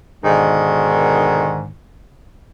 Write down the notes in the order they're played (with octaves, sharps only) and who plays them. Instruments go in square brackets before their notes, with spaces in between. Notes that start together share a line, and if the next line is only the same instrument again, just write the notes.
[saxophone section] G#2 B2 D3 D#3